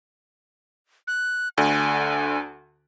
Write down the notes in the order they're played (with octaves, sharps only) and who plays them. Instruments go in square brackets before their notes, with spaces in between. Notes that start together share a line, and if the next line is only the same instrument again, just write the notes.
[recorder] F#6
[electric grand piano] D2 D3 [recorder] G#5